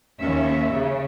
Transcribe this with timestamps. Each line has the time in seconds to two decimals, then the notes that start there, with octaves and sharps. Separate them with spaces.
0.21 D#2 C#4 E5
0.71 C#3